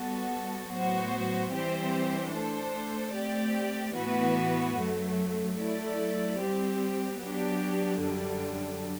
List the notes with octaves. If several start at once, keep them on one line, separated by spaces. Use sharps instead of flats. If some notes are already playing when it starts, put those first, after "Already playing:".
Already playing: G3 B3 F#4 A4
A2 F#3 B3 F#4 C5
E3 G3 C4 G4 C5
A3 D4 A4 C5
A3 C4 G4 D5
A2 E3 B3 F#4 B4
F#2 F#3 A3
F#3 A3 E4 A4 D5
G3 C4 G4
F#3 B3 D4 G4
F#2 D3 G3 D4